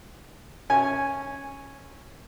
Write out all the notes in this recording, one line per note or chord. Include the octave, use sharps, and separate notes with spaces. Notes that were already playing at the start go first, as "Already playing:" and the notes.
C#4 G#5